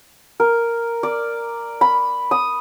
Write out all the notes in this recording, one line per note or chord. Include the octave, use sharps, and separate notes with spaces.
A#4
D5
B5
D#6